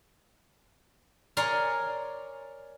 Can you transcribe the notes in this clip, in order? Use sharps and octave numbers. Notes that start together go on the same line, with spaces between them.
A#4 C#5 D5 G#5 A#5 C6